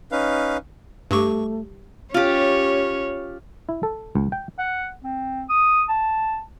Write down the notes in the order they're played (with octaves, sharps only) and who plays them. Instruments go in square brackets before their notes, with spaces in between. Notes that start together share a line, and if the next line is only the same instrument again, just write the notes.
[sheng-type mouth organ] C#4 D#4 B4 F5
[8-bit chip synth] G2 C#6 [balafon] G3 G4 D6 [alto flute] A3
[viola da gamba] C#4 C#5 [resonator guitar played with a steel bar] F4 G4
[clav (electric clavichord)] E4
A4
C#2
G5
[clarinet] F#5
C4
D#6
A5